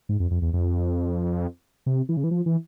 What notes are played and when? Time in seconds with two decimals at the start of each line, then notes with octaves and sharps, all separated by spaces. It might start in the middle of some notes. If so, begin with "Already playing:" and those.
0.09 G#2
0.20 F2
0.31 F2
0.42 E2
0.53 F2
1.86 C3
2.09 E3
2.17 C#3
2.24 E3
2.31 F3
2.46 E3